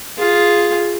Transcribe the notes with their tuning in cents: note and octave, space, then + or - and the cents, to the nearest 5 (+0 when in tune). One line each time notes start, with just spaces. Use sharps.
F4 +0 G#4 +0